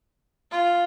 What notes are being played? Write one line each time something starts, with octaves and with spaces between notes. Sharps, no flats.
F4